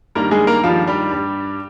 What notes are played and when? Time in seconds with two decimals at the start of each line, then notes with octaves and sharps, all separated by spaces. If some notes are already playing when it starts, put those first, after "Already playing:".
0.15 G2 D#3 G3 A#3 A#4
0.31 G#3 G#4
0.47 A#3 A#4
0.64 G2 D#3 F3 G3 F4
0.87 G3 G4
1.11 G2 G3